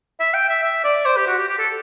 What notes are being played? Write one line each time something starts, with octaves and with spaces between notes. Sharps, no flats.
E5
G5
E5
E5
D5
C5
G4
F#4
G4
G4
A4